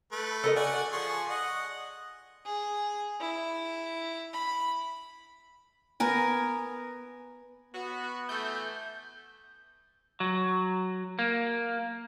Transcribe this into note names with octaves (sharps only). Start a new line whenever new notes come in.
A3 B4
A4 A#4 D#5
F#4 D5 F#5 G#5
F3 G#4 C#6
D#5 F#5
G#4
E4
B5
B3 A#4 G#5
B3 F#4
E3 A3 G6
F#3
A#3